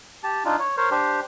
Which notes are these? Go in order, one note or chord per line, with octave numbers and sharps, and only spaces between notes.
G4 A5
D4 D#4 F4
C#5
A#4 C5 C#5
D4 G4 C5